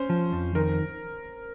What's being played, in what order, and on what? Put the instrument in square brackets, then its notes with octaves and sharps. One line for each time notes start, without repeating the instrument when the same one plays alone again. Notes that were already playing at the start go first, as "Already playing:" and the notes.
Already playing: [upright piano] C#4 C5
[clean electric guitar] F3
F2
[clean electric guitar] D#3 [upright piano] A#4